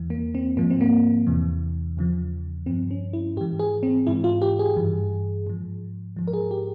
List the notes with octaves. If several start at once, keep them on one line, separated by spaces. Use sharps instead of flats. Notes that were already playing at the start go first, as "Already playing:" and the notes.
Already playing: E2 E3
A#3
C4
G#2 F3 A#3
C4
A#3
E2 C3 E3
E2 C#3 F3
G2 F3 C4
C#4
E4
G#2 E3 G4
G#4
C4
G#2 E3 E4
F4
G4
G#4
G2 E3
G#2 F3
G#2 F3
A#4
G#4
G4